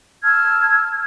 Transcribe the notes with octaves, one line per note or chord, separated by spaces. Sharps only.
A5 E6 F6 G#6